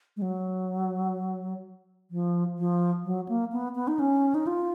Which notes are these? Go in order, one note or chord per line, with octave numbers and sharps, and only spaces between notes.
G#3
F#3
F3
F3
F#3
A#3
B3
B3
D#4
C#4
D#4
F4